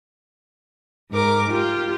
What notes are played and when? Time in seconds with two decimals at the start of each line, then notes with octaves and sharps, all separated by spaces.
1.10 G#2 A#4 D6
1.49 F4 G4